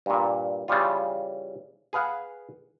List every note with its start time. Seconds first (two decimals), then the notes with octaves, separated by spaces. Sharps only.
0.06 G2 A#2
0.68 C#3 E3 G3 F4
1.93 G#4 B4 F5 F#5